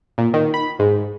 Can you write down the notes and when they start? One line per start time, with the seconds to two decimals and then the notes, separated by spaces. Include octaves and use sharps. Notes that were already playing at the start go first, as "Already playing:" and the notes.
0.18 A#2
0.34 D#3
0.54 B5
0.79 G#2